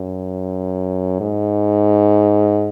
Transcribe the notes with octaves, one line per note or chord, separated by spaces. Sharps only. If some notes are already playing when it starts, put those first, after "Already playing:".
Already playing: F#2
G#2